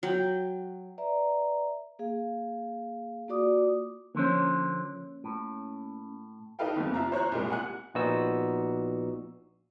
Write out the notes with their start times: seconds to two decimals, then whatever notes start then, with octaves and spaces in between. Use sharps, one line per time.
0.03 F#3 G5
0.98 B4 D5 E5 A#5
1.99 A#3 G#4 F5
3.28 A#3 F4 F#4 D5 D6 D#6
4.15 D3 F3 A#3 C#4 C5
5.24 A2
6.59 D#4 G4 A4 B4 F5 G5
6.76 F#1 F2
6.94 E4 F4 A#5
7.12 C5 C#5 A#5 F#6
7.32 C2 A#2 G#3
7.50 F#5 G#5 F#6
7.94 A#1 A#2 B3 D#4 F#4 E6